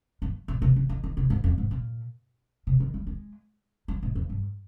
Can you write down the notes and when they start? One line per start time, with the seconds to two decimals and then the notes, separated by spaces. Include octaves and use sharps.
0.22 G2
0.48 A#2
0.62 C3
0.76 C#3
0.89 D#3
1.04 D#3
1.17 C3
1.30 G#2
1.44 F2
1.58 G#2
1.71 A#2
2.67 C3
2.80 D#3
2.94 G3
3.07 G#3
3.88 G3
4.03 G#2
4.15 F2
4.29 G2